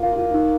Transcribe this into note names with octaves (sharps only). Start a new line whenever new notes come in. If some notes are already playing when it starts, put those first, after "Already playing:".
Already playing: A#3 F4
F4
D#4